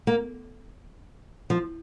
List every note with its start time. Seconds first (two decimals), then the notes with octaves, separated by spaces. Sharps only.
0.07 A#3
1.50 F3